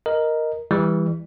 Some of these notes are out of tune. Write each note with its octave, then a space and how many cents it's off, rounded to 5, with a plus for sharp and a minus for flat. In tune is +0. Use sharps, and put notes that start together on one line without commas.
A#4 +0 D#5 +0
E3 +0 G3 +30 E4 +5